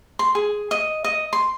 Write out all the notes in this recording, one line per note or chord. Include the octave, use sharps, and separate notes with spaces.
C6
G#4
D#5
D#5
C6